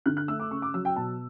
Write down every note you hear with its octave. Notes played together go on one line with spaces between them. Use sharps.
D3 F#6
F#6
A3 E6
D6
C#3 C#6
D6
F#3 E6
G5
B2 A5